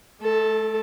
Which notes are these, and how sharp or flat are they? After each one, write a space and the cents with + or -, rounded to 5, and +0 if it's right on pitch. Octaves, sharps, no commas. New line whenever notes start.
A3 -40 A4 +0